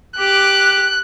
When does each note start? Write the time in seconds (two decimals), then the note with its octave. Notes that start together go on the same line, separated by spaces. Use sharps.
0.18 G4 D6 F#6